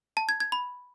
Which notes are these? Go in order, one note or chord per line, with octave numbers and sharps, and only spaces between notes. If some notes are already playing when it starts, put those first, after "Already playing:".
A5
G#6
G#6
B5